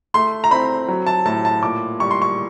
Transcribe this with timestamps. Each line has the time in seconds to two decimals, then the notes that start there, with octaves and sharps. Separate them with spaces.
0.14 A3 C6
0.44 A#5
0.51 C4 B5
0.88 F#3
1.07 A5
1.25 A2 A5
1.45 A5
1.63 A#2 D6
2.00 G3 C#6
2.11 C6
2.22 C#6